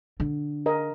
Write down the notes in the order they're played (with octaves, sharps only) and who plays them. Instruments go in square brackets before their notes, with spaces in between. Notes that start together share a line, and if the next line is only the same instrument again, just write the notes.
[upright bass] D3
[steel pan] A#4 D#5